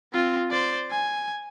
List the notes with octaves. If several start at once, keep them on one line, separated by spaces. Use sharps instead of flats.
C4 F4
C5 D5
G#5